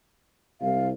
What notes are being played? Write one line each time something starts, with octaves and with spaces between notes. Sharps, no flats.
C2 F5